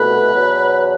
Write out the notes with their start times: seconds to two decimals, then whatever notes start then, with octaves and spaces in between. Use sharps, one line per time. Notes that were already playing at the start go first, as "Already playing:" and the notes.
Already playing: C2 B2 A3 B4
0.32 E2 B2 F#3